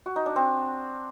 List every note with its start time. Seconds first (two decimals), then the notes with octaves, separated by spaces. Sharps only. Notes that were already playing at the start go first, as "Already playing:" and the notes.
0.06 F#4
0.16 D#4
0.26 D4
0.36 C4